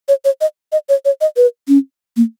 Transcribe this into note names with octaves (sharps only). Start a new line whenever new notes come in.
C#5
C#5
D#5
D#5
C#5
C#5
D#5
B4
C#4
A#3